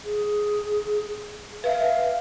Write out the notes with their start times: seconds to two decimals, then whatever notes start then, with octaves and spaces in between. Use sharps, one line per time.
0.05 G#4
1.64 B4 E5 F5